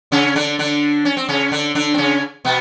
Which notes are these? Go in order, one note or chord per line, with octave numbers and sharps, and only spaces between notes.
C#3 C#4
D3 D4
D3 D4
C#4
C4
C#3 C#4
D3 D4
D3 D4
C4
C#3 C#4
B2 B3